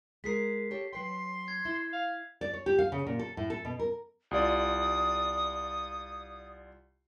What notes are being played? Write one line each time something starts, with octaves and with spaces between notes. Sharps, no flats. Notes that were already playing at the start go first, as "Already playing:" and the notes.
G#3 G#4 A#4 B6 C7
G4 A4 C#5
F#3 B4 G5 C6
G#6
E4
F5
D5
C#5
G4
F5
C#3
A#2
A4
A2
A4
B2
A#4
C2 F4 D5 D#6